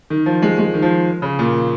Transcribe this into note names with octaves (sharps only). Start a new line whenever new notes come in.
D#3
F3
G#3
G#3
D#3
F3
C#3
A#2